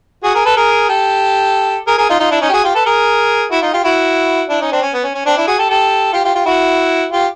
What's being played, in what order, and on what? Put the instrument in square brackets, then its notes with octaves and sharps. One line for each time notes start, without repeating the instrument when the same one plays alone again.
[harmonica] F#4 G#4
G#4 A#4
A4 B4
G#4 A#4
G4 A4
G#4 A#4
G#4 A#4
D#4 F4
D#4 F4
D4 E4
C#4 D#4
G4
F#4 G#4
F4 G4
A4 B4
G#4 A#4
E4 F#4
D#4 F4
F4 G4
E4 F#4
D4 E4
C#4 D#4
C4 D4
C#4
B3
C#4
C#4
C4 D4
D4 E4
F#4 G#4
G4 A4
G4 A4
F4 G4
F4 G4
F4 G4
E4 F#4
F4 G4